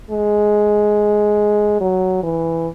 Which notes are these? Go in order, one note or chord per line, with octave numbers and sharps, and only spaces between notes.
G#3
F#3
E3